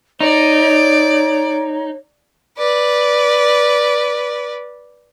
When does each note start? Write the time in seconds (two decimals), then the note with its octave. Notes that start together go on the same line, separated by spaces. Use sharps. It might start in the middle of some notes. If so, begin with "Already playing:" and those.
0.20 D#4 C#5 D5
2.58 B4 D5